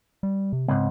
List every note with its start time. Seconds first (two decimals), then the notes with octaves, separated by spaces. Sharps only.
0.23 G3
0.53 C3
0.68 C#2 G#2 C4